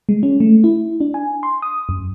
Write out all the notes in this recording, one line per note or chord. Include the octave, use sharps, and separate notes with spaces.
G#3
C#4
A3
E4
D4
G#5
C6
D#6
F#2